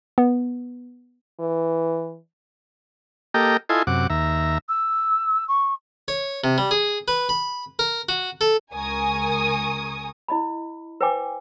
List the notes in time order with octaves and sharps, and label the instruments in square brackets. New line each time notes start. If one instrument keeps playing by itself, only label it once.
[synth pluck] B3
[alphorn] E3
[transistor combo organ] A#3 G4 A4 D#5 G5 A#5
E4 F4 A4 D#5 G#5 C6
F#2 C3 F#5 D6
D#2 E5 A#5
[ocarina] E6
C#6
[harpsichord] C#5
C3
G3
G#4
B4
B5
A#4
F#4
A4
[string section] C#2 A#4 G#5 C#6 D#6
[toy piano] E4 D#5 B5
B4 C5 E5 G5 G#5 D6